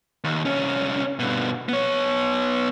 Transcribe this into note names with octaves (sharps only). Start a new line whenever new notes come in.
D#2
C2 C#4
G2 B2
B3 C#5